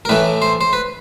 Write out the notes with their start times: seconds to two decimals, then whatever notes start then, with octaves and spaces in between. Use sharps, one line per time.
0.05 A#4
0.09 A2 E3 A3 B4
0.42 C5
0.61 C5
0.73 B4